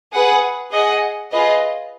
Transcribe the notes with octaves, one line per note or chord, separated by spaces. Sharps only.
G#4 B4 F#5
G#4 D#5 F#5
F4 G#4 B4 D#5